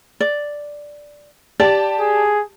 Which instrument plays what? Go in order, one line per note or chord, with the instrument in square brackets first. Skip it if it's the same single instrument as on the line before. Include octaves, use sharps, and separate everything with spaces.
[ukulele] D5
[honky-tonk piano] G4 A5 [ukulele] D5
[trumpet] G#4